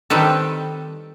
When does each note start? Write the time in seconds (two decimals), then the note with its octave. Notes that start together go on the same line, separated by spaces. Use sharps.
0.10 D#3 G3 C4 A4 B4